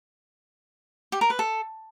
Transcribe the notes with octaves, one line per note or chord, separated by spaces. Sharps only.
G4
A#4
B4
A4